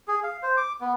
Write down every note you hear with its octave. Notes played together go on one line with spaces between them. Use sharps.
G#4
F5
C5
D6
B3